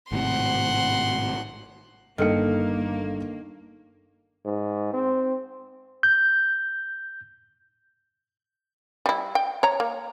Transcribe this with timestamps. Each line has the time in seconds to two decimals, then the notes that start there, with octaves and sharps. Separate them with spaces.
0.12 G#1 A2 C3 F#5 C6
2.18 G1 D#3 A#3 A4 C#7
4.45 G#2
4.93 C4
6.03 G6
9.06 G3 E4
9.35 G5
9.63 C#5 A#5
9.80 A#3